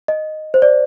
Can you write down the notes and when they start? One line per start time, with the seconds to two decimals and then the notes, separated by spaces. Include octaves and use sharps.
0.08 D#5
0.54 C5
0.62 D5